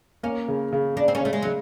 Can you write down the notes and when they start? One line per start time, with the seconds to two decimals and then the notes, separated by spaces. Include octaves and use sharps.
0.23 A#3 C#4
0.48 C#3
0.73 C#3
0.96 C#3 D4
1.08 C4
1.15 C#4
1.21 C#3 A3
1.33 G#3
1.42 C#3 F#3